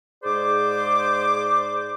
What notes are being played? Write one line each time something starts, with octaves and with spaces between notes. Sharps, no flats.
G#2 G#4 C5 D5 D6